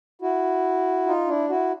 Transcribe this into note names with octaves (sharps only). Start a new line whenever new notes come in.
E4 F#4
D#4 F4
D4 E4
E4 F#4